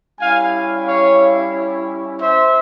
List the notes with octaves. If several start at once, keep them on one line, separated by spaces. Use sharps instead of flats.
G3 C#4 E4 F5 G#5
C#5 F5
C5 E5